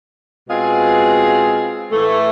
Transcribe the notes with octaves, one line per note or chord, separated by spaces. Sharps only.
B2 G#3 C4 F4 G#4
A2 E3 A3